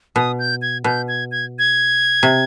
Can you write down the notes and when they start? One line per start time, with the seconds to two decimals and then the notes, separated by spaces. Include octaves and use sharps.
0.16 B2 D#6
0.39 G6
0.62 G#6
0.84 B2 G6
1.08 G#6
1.32 G#6
1.59 G#6
2.23 C3